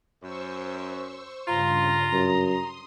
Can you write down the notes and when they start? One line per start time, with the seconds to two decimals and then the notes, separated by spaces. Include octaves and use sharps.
0.23 F#2 C5 C#6 E6
1.48 G2 C#3 F4 A#5
2.13 F#2 C6 D#6